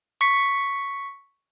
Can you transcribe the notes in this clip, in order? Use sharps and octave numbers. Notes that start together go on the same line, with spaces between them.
C#6 B6 C#7